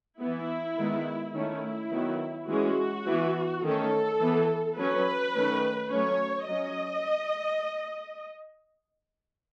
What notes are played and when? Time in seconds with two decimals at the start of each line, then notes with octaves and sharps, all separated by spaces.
0.21 E3 B3 E4
0.78 D#3 G#3 B3
1.34 D#3 A3 C#4 E4
1.92 D#3 F#3 B3
2.49 E3 G#3 C#4 F#4
3.06 E3 B3
3.63 D#3 A3 C#4 A4
4.20 E3 B3
4.77 F#3 C#4 B4
5.34 D#3 A3 C#4
5.91 F#3 A3 C#4 C#5
6.48 F#3 C#4 D#5